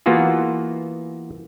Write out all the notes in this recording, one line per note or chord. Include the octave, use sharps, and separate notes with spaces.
E3 A#3 B3 F4 F#4 G#4